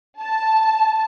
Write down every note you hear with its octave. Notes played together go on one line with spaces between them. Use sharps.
A5